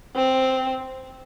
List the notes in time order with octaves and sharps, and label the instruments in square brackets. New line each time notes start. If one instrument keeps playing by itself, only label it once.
[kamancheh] C4